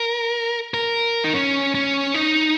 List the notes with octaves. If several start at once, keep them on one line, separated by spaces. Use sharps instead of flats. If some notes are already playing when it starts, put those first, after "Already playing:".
Already playing: A#4
A#4
D#4
C#4
C#4
D#4